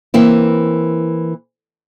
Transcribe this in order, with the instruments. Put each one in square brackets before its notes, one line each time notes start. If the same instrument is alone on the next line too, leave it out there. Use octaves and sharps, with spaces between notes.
[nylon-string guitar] E3 A#3 C4 E4